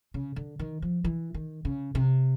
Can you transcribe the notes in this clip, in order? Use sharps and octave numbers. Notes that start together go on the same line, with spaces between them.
C#3
D3
D#3
F3
E3
D#3
C#3
C3